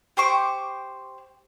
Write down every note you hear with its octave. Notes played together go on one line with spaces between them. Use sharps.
G4 C5 C#6 D6